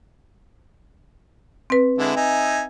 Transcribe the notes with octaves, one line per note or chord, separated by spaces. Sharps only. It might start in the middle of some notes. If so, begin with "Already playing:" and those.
C4 B4
D3 G#3 E4
D#4 E5 G#5